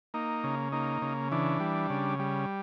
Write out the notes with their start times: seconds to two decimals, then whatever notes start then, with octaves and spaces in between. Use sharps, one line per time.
0.14 A#3 D#4
0.44 C#3
0.72 A#3 D#4
1.02 C#3
1.31 E3 D4
1.60 G3
1.90 C#3
2.19 G3